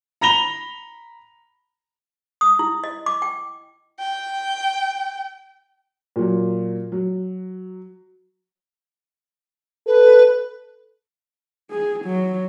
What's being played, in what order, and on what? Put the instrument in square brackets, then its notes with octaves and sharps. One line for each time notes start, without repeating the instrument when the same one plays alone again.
[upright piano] A#5 B5 A#6 F7 G7
[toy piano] D#6
E4
D#5
D6
G5
[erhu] G5
[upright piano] A#2 F#3
F#3
[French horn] A4 [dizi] B4
[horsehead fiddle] G#4
F#3